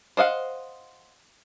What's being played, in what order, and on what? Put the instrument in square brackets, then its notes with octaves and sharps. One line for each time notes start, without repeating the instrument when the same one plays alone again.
[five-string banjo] C5 D#5 F5 F#5